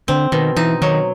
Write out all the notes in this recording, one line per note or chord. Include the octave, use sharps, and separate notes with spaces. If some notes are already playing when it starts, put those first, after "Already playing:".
D3 C4
B2 D#3
E3 D#4
D#3 F#3